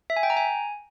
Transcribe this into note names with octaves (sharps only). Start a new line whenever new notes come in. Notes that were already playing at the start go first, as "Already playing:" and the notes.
E5
G#5
G5
A#5
G#5